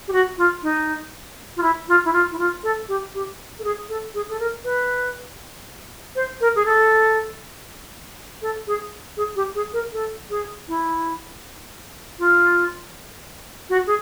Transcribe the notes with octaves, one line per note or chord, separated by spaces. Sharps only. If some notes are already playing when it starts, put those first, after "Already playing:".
G4
F#4
F4
D#4
F4
E4
F4
E4
F4
E4
F4
A4
G4
G4
A4
G#4
A4
G#4
A4
A#4
B4
C5
A#4
G#4
A4
A4
G#4
G#4
G4
G#4
A#4
A4
G#4
E4
F4
F#4
G#4